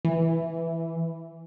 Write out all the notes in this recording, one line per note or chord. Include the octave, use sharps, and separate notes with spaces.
E3